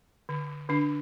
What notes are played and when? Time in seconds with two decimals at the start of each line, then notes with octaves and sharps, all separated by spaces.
0.29 D3
0.69 D3 D4